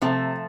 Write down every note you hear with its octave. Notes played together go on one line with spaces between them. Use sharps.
C3 F3 A3